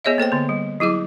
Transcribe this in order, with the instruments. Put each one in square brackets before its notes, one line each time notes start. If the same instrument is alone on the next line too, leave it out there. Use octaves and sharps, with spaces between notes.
[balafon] B3 G#4 C#5 D#5 E5
A#3 A4 C5 G5
D3 B3
G3
F#3 E4 G#4 D6